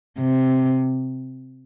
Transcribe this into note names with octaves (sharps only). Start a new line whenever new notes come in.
C3